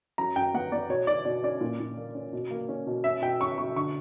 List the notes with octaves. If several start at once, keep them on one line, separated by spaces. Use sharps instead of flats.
F#2 A#5
F#2 G5
B3 F#5
B3 D5
B2 C#5
B2 D5
B2 D5
C#4 D5
A#2
A#2
A#3
C#4
B2
A#3
C#4
B2
C#4 E5
B2 G5
C#4 C#6
B2 C#6
D3 C#6